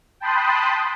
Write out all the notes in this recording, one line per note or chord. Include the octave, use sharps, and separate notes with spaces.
G5 A5 B5 C6 D#6 F#6